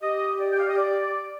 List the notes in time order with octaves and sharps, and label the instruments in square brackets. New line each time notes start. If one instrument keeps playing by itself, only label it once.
[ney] G4 [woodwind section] D#5
[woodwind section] D5
G5
F5
D#5
D5